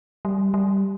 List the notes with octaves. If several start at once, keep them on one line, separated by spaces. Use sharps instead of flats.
G3
G3